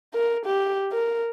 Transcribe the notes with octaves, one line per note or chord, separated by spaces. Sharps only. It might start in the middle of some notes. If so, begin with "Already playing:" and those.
A#4
G4
A#4